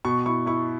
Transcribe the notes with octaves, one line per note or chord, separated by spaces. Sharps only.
B2 C#6
E4 C#6
E4 C#6